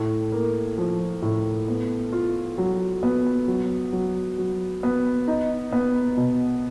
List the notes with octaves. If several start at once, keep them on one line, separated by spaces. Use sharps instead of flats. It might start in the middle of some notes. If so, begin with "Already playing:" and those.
Already playing: A2
A#3
F3
A2
B3
F4
F#3
B3
F#3
F#3
F#3
B3
D#4
B3
B2